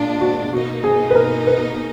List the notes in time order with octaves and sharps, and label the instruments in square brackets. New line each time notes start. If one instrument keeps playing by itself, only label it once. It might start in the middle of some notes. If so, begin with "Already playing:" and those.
Already playing: [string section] A#2 G#3 D4 F4
[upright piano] F#4
[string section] B2 A#3 D#4 [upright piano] F#4
[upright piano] G#4
B4
A#4
B4